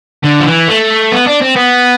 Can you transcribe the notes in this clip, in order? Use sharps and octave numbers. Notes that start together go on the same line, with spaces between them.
D3
F3
E3
A3
B3
D4
C4
B3